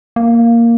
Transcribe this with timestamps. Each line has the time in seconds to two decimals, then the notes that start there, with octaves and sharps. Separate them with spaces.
0.16 A#3